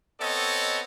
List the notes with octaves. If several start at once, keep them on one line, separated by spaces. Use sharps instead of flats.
B3 C4 A4 C#5 D#5